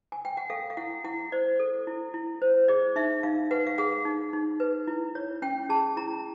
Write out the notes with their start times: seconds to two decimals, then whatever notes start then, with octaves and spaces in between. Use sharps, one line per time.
0.12 G#5
0.25 G5
0.37 F#5
0.50 A4 F5
0.70 F5
0.77 E4 F#5
1.04 E4 F#5
1.32 C5 D5
1.59 A4
1.87 E4
2.14 E4
2.42 C5
2.68 G#4 D5
2.96 D#4 E5
3.23 D#4 F5
3.51 B4 F#5
3.67 F5
3.78 G#4 F#5
4.05 D#4
4.33 D#4
4.60 B4
4.87 E4
5.15 C#5
5.42 C#4 G5
5.69 G#4 A5
5.97 E4 A#5